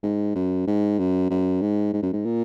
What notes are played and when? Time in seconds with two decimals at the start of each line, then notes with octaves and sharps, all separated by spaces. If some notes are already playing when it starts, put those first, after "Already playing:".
0.03 G#2
0.35 F#2
0.67 G#2
0.99 F#2
1.30 F#2
1.61 G#2
1.93 G#2
2.02 F#2
2.13 G#2
2.25 A#2